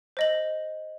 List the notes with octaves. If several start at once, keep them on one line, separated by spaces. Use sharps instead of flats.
C5 D#5 F#7